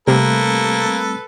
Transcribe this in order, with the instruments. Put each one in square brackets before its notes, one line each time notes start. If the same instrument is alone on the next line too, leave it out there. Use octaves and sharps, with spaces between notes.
[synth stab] C3 [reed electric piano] G3 A3 C4 [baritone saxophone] A#3 [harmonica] A4 B4